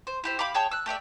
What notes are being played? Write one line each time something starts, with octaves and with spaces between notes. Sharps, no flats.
C5
E4 G4 C5
G4 F5 B5 D6
G#4 C#5 G5 A5
E6 F#6
A3 G4 D5 E5